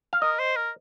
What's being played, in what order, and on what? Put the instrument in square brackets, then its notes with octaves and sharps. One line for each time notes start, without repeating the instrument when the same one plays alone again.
[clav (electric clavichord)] F5
[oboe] A#4 [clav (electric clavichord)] D#5
[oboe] C5
A#4